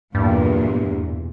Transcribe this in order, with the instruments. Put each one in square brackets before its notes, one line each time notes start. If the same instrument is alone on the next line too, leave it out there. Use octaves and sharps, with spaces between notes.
[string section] B1 E2 A#2 [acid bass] G2